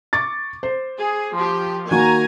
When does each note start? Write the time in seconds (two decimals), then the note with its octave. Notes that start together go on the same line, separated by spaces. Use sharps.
0.13 C#6 D6 A6
0.63 C5
0.99 G#4
1.36 F3 G4
1.91 D#3 A#3 F#4 G#5 A#5